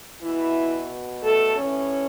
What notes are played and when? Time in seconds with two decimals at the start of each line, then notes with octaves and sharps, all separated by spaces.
0.20 B2 E3 E4
1.22 A3 A4
1.55 A2 E3 C#4 C#5